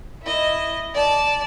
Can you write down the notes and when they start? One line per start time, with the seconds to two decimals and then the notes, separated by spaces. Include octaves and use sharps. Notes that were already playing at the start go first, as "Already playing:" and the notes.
0.22 E4 D#5
0.94 D5 A5